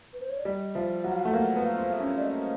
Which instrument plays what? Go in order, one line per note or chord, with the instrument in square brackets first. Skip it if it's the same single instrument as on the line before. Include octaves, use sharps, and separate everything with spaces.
[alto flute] B4
C5
C#5
D5
[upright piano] G3 [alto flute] D#5
[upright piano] F3 [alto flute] E5
[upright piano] F#3 [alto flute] F#5
[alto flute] F5
F#5
[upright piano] A3
[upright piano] A#3 [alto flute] F#5
[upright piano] B3
[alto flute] F5
[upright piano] C4
[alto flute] E5
[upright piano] C#4
[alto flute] D5
D#5